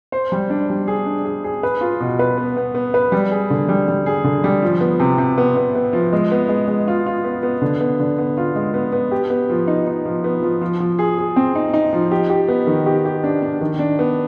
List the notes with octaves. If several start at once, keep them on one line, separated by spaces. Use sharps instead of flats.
C5
G3
D4
G3
G#4
D4
G#4
G#4
B4
F4
B2
B4
B3
B3
B3
B4
G3
G#4
D3
G3
G3
G#4
D3
G3
F3
B3
C3
C3
B3
B3
B3
F3
G#3
B3
G#3
G#3
F4
F4
B3
B3
D3
B3
D3
B3
F4
G#3
B3
B3
G4
B3
F3
D#4
D#4
F3
B3
F3
F3
F3
G#4
G#4
C4
D#4
D#4
F3
G4
G4
B3
D#3
G4
G4
D4
D4
D#3
D4
B3